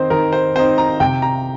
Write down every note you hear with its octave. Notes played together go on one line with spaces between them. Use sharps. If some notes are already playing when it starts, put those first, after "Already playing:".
Already playing: D#3 C4 D#4 C5
D#3 A#4
C5
C4 D#4 C5
A#5
C3 G5
A#5